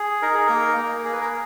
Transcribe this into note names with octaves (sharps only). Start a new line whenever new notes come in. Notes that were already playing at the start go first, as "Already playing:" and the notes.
Already playing: G#4
D#4 A#4
G#4
A#3 A#4
A#3
G#4 A#4
B4
A#4